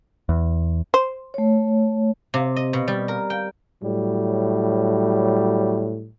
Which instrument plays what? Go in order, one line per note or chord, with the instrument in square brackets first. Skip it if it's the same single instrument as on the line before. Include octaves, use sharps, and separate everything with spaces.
[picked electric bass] E2
[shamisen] C5
[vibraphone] A3 C#5
[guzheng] C3
D#5
B2
G3
A#4
G5
[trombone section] A2 F#3 G3